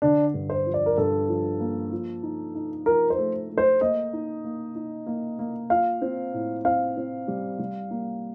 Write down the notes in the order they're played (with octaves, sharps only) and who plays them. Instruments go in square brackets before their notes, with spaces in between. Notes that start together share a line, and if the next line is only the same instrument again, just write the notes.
[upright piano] D3 [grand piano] D4
[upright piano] G2
[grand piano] C5
[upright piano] F3
[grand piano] D5
A#4
[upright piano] G2 [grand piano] A4
[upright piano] F3
A#3
F3
D#4
D#4
[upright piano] F3 [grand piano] A#4
[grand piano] C5
[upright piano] A3
A3
[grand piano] C5
[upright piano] A#3 [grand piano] D#5
[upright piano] D#4
A#3
D#4
A#3
A#3
[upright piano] F4 [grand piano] F5
[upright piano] C4
A2
[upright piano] C4 [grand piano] F5
[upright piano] C4
G3
G3
A#3